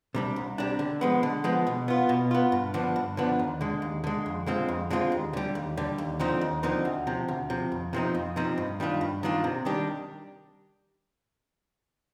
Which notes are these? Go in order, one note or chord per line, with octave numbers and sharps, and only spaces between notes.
C3 G3 D4
C2
C3 G3 D4
D3
F3 G#3 B3
D3
F3 G#3 B3
B2
B3 F4
B2
B3 F4
G2
D3 F3 B3 D4
G2
D3 F3 B3 D4
D#2
D3 G#3
D#2
D3 G#3
F2
D3 G#3 C4 F4
F2
D3 G#3 C4 F4
D#2
D3 G3
D#2
D3 G3
D#2
D3 F3 C4 D#4
D#2
D3 F3 C4 D#4
D2
C3 F3
D2
C3 F3
F2
C3 F3 C4 D#4
F2
C3 F3 C4 D#4
G2
D#3 G3 D4 F4
G2
D#3 G3 D4 F4
C3
D#3 G3 D4 G4